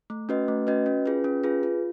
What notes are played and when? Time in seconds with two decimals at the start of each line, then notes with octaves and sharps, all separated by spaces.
0.10 A3
0.29 C#4 F#4 B4 D#5
0.48 A3
0.67 C#4 F#4 B4 D#5
0.86 C#4
1.06 F4 G#4 B4
1.24 C#4
1.44 F4 G#4 B4
1.63 F4